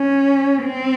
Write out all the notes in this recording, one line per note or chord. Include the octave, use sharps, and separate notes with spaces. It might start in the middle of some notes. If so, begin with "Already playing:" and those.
Already playing: C#4
C4